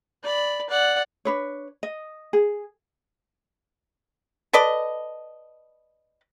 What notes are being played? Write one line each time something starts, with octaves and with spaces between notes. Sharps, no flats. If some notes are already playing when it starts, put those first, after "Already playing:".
D5 B5
D5 F#5
D4 B4 C#5
D#5
G#4
A4 B4 D5 D#5